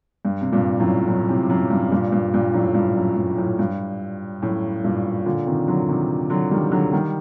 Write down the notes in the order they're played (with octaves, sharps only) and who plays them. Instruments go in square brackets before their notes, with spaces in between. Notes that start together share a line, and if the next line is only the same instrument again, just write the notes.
[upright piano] G2
C3
G2 A#2
F#2 A2
F#2 A2
A2 C3
F#2
G2
G2 A#2
G2
G2 A#2
F#2 A2
G2
F#2
G2
F#2 A2
G2
F#2 A2
G2 A#2
A#2 D3
C3 D#3
D3 F#3
C3 D#3
D3 F#3
D#3 G3
D3 F#3
D#3 G3